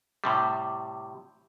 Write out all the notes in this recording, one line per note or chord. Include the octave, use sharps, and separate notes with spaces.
A2 C3 G3